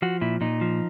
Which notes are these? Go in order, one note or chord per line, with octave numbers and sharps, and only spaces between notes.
F3 F#4
A#2 E4
A#2 D#4
F3